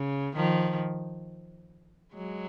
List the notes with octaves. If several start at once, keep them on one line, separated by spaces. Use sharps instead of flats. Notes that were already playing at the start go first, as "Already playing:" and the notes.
Already playing: C#3
D#3 F3
F#3 G#3